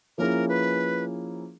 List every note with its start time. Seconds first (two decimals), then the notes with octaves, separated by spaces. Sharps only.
0.18 F3 A#3 C#4 E4 G#4 A#4
0.49 B4